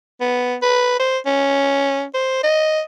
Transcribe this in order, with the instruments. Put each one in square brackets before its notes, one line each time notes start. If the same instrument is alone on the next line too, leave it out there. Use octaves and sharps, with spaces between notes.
[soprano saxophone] B3
B4
C5
C#4
C5
D#5